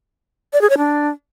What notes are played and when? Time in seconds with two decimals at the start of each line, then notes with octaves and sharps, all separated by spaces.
0.53 D5
0.61 G#4
0.70 C#5
0.78 D4